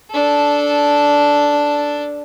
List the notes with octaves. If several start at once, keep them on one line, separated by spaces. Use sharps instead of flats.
D4 A4